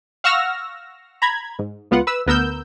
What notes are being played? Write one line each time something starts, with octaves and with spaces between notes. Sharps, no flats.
F5 F#5 C#6 E6 F6 A#6
A#5 B5 G#6
G#2
C#2 B3 F4 F#5
B4 E6
D2 B3 A#4 E6 G6